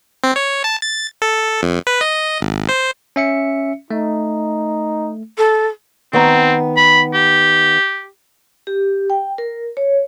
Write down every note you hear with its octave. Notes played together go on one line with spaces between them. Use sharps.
C4
C#5
A5
A6
A4
F2
B4
D#5
G#1
C5
C#4 E5 C#7
A3 D#4
A4
D#3 B3 C4 A#5
B5
G4
G4
G5
A#4
C#5